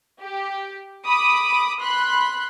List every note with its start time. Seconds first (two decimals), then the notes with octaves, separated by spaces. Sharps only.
0.21 G4
1.06 B5 D6 D#6
1.81 B5 C6 F#6